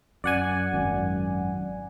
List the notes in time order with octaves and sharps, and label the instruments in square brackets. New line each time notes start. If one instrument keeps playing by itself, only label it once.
[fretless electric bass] F#2 [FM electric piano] D5 F#5 G#5
[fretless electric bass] G#1 F#2